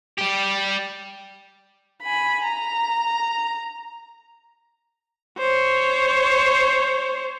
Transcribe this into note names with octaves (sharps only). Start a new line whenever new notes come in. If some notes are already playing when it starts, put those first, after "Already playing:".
G3 G4
G#5 B5
A#5
C5 C#5